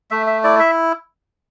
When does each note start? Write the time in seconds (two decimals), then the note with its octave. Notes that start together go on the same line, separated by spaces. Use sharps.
0.11 A3 E5
0.27 E5
0.44 E4 D5
0.60 E5